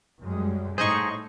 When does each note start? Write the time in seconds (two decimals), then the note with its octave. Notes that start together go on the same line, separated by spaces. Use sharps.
0.21 F#2 G3 G#3
0.78 A2 D#4 G#4 C5 D#5 C#6